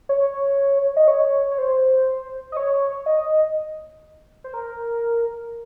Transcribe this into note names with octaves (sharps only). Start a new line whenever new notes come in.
C#5
D#5
C#5
C#5
C5
D#5
C#5
D#5
C5
A#4